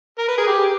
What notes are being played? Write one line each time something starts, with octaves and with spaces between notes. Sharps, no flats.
A#4
B4
G#4
G4